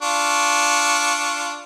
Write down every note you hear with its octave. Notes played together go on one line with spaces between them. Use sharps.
D4 F4 C#6